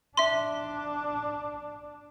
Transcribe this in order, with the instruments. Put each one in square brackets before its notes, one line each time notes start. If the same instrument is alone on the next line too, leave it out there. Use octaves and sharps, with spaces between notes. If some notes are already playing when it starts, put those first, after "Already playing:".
[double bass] D4 [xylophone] E5 C6